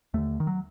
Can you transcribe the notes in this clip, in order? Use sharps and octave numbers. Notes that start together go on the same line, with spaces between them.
D#2 D3 A3
D#3
F#3